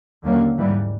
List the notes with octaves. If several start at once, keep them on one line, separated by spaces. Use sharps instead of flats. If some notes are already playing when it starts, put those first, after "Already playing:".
D#2 D3 F#3 A#3 C#4
G#2 E3 G3